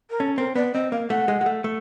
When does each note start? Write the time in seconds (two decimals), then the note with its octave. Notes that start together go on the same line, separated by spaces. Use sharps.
0.10 A#4
0.20 C#4 A4
0.38 C4 A#4
0.56 B3 D5
0.74 C4 D#5
0.92 A#3 F5
1.10 A3 F#5
1.28 G#3
1.41 G#3
1.46 A3
1.64 A3